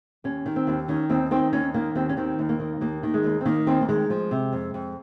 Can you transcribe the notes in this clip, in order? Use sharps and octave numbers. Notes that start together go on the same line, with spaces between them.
D#2 C#4
D#3
C4
D#2
D#3 C#4
D#2 C4
D#3 C4
D#2 C#4
D#3 A#3
D#2 C4
C#4
D#3 C4
D#2
A#3
D#3
D#2 A#3
D#3
G#3
D#2
C4
D#3 A#3
D#2 C4
A#3
D#3 G#3
F3
C3
F2
F2